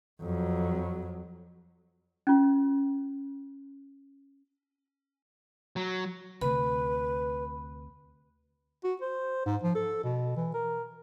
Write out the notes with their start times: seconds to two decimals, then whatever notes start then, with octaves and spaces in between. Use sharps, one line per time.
0.22 F2 F#3
2.27 C#4 F4
5.76 F#3
6.41 D2 C3 B4 B5
8.84 F#4
9.01 C5
9.46 G#2
9.63 F3
9.75 A4
10.04 B2
10.36 E3
10.54 A#4